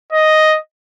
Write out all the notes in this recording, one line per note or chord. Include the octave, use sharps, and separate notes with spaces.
D#5